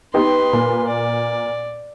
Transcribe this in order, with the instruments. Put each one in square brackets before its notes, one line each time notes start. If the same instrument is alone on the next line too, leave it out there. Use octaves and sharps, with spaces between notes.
[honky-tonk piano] B3 D#4 G4 [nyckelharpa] B4 C6
[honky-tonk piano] A#2
[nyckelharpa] D5